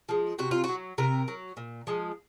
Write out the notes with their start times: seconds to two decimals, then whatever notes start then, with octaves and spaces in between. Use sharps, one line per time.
0.09 F3 G#3
0.39 C3 F#4
0.51 F4
0.64 F#3 F#4
0.98 C3 A#4
1.28 F#3
1.57 A#2
1.87 F3 G#3